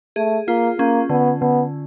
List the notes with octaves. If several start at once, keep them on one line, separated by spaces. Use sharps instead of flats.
A3 G#4
A#3 F4
A#3 C#4
D3 B3
D3 B3